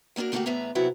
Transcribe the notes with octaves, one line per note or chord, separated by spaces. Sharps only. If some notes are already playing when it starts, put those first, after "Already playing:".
A2 A#3 D4 F#4 A#4
D3 A3 A#3 D4 F#4 G4
E2 A2 B3 D4 E5 A#5
C3 F#3 B3 E4 F#4